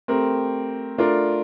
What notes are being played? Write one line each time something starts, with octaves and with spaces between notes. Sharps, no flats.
A3 C4 G4 A#4
A3 D4 F4 A#4 D5